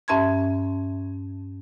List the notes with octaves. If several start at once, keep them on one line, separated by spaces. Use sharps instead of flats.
G2 C#4 E5 A5 C6 G#6